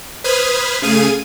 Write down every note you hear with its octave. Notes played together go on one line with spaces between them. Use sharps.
B4 C5 B5 D#6 F6 G#6
C#3 A3 G#4 F5 G#5 D#7